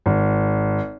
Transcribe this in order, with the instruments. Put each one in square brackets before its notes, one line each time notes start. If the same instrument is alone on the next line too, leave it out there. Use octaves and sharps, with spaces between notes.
[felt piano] G#1